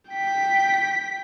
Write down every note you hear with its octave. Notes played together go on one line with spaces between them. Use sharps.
G5 B6